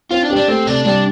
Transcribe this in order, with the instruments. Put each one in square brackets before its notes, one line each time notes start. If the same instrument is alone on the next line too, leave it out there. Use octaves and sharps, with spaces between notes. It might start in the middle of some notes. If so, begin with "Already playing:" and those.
[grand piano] C4 [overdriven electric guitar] F4
[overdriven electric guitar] D4
[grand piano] G4
[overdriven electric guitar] D4
[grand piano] A3 [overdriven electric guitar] C4
[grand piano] C3 [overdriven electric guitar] D4
[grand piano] G3 [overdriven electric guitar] D4